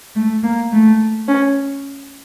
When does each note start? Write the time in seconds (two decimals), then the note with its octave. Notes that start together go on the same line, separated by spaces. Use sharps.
0.15 A3
0.43 A#3
0.72 A3
1.28 C#4